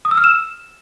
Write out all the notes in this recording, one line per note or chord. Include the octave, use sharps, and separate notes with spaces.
D#6
E6
F6
E7